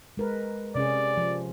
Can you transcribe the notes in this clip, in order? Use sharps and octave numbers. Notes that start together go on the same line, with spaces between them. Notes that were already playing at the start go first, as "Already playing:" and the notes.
G#3 A#4 B4
C3 C#4 G#4 D5
F3